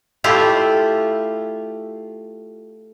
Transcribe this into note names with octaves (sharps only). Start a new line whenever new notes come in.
A3 E4 F4 G4